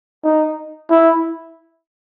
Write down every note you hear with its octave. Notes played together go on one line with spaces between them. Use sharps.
D#4
E4